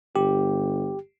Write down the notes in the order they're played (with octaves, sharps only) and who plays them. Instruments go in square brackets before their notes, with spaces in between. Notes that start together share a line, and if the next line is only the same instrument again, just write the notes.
[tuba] G1 [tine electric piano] G4